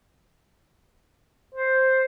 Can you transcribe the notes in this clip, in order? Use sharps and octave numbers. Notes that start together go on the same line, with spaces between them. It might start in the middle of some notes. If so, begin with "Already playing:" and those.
C5